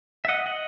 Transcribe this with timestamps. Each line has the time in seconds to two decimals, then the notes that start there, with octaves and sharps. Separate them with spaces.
0.25 E5
0.28 D#5 F#5
0.46 D#5 F#5